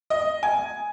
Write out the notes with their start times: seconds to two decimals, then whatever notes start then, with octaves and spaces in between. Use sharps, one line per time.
0.10 D#5
0.43 G#5